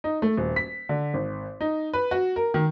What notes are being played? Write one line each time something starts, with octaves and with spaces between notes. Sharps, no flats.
D#4
A3
D#1
B6
D3
G#1
D#4
B4
F#4
A#4
D#3